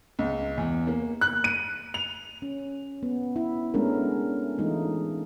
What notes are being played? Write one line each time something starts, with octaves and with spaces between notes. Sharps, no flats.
C#2
E2
A#3
F#6
D#7
F7
C#4
B3
E4
G#3 A3 B3 C#4 D4 A#4
E3 G#3 A3 D#4 F4